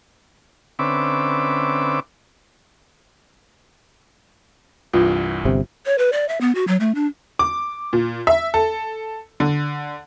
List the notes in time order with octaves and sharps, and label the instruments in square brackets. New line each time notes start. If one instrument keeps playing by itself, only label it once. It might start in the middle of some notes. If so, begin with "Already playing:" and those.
[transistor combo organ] D3 C4 C#4 B4 E5 D6
[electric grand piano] C2 G2 E3 [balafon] F4
[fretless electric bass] G1 C3
[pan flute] C#5
B4
D5
E5
B3
F#4
F#3
A3
D4
[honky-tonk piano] D6
A#2
E5
A4
D3